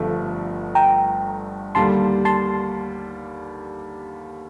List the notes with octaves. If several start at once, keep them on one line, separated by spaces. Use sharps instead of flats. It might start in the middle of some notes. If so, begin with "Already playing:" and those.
Already playing: G1 G2 D3 F3 A3
G5 A#5
D#2 D3 G3 A#3 A5 C6
A5 C6